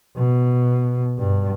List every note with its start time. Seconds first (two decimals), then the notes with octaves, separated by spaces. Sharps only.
0.17 B2
1.19 G2